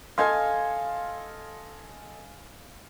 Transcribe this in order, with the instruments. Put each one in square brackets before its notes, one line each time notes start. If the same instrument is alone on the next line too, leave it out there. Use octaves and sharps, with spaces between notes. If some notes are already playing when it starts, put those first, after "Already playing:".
[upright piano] A4 D#5 C6 [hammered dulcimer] F5 G#5